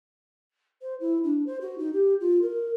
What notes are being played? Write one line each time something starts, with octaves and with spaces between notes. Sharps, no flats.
C5
E4
D4
C5
F#4
D#4
G4
F4
A#4